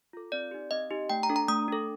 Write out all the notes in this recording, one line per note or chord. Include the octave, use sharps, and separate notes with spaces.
F4 A4
C4 D5
D#4 G4
C4 D#5
D#4 G4
A3 G5
A#5
D4 A4
A#5
A3 D#6
D4 A4